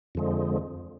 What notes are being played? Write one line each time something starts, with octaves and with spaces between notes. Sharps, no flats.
F2 D3 F3 G#3